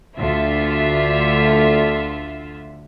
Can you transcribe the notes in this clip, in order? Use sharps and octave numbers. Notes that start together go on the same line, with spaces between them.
D2 D3 F4 E5